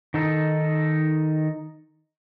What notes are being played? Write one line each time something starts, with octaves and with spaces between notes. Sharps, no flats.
D#3 D#4 A4